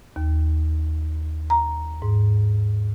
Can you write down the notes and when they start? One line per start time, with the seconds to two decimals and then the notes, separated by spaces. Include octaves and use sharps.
0.16 D#2
1.50 A#5
2.02 G#2